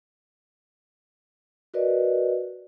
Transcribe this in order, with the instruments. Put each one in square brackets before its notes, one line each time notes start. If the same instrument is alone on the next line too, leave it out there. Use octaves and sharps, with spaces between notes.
[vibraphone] F#4 A#4 B4 D5 D#5